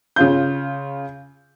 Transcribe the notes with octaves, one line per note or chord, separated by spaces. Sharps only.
C#3 F4 G6